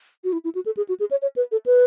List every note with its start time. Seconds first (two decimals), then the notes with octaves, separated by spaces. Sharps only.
0.24 F#4
0.32 E4
0.44 E4
0.55 F#4
0.66 A4
0.77 G#4
0.89 F#4
1.00 G#4
1.11 C#5
1.22 C#5
1.36 B4
1.52 A4
1.66 B4